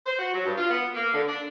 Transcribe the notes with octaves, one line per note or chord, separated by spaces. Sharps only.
C5
F#4
F#3
G2
F4
B3
A#3
D3
D4